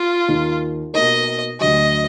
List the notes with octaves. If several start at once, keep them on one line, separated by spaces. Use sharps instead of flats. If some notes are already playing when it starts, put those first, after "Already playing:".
Already playing: F4
D#2 D#3 A#3 D#4
B2 A#3 D#4 A#4 D#5
D2 D3 F#3 D#5